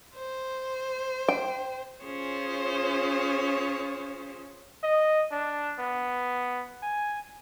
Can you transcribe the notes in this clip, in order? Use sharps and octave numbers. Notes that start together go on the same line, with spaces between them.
C5
G5
C#4 F4 G#4 C5 C#5
D#5
D4
B3
G#5